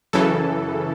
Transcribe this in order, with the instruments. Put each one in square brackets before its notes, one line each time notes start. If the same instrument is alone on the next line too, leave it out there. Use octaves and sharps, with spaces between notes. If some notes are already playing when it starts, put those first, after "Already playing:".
[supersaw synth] F#2 C#3 E3 A4